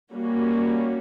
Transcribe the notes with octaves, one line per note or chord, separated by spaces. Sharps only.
G3 A#3 C#4 F#4